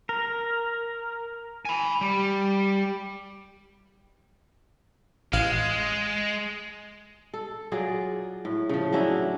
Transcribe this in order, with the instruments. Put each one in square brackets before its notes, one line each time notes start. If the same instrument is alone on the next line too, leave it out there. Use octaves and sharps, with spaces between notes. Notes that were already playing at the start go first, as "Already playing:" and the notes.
[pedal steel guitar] A#4
[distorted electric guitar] G#5 B5
G3
[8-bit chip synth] A1 F5 [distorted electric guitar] G#3
[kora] A4
F#3 F4 G#4 D5
A2
C#3 F3
F#3 C#4 D4 E4